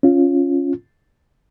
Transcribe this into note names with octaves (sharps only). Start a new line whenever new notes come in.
C#4 F4